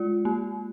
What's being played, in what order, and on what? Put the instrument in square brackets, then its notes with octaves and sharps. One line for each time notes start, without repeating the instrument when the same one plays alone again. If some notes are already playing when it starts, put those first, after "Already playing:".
Already playing: [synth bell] G#3 F4
A#3